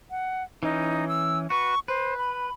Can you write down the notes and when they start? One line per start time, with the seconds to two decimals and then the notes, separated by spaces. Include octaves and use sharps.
0.11 F#5
0.63 E3 C#4 D#4
1.09 E6
1.50 F#4 B4 C#6
1.88 B4 C5
2.18 B5